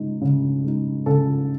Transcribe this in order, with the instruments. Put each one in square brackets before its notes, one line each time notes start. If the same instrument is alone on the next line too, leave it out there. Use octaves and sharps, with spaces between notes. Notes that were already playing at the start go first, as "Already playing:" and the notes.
Already playing: [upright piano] C#3 G#3 D#4
C#3
G#3 D#4
C#3 A4